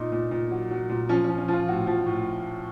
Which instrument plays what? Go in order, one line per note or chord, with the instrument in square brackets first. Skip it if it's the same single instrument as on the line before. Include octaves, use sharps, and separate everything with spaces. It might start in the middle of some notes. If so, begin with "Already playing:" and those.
Already playing: [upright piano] A#2 D#4
A#2
A#2
F#3
F#3
A#2
F3 C#4
C#4
F3
C#4
F3 F4
A2 F#4
F3
A2